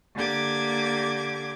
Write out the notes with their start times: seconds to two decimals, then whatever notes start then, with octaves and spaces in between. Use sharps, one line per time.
0.15 D3 A#3 G4 D6 G#6